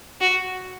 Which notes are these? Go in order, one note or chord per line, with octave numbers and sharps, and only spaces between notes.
F#4